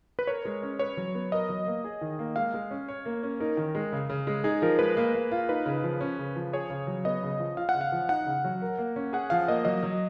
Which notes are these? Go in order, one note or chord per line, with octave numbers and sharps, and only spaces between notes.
B4
A#4 C#5
G#3
C#4
B4 C#5
F#3
B3
A#4 D#5
F#3
A#3
G#4
D#3
A#3
G#3 F5
G#3
C#4
C#5
A#3
C#4
D#4 A#4
D#3
G#3
C#3
C#3
G#3
D#4 G#4
F3 A#4
G#3 B4
A#3
A#3
F4
D#4 B4
C#3
F3
C#4
C#3
F3
G#4 C#5
C#3
F#3
B3 D#5
C#3
F3
F4 F5
F#5
C#3
F5
F3
D#4 F#5
C#3
F#3
A#4
A#3
C#4
G#4 F#5
F3 F5
A#3 D#5
F#3 D#5
F#3